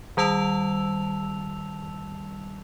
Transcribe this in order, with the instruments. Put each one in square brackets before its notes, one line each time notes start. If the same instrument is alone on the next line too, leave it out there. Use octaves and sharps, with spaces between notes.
[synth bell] D#3 G3 A5 E6 F7